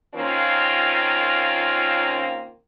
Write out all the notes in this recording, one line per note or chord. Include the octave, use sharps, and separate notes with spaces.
D#3 A#3 C4 C#4 F4